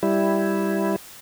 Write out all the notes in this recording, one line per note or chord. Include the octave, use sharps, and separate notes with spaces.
G3 E4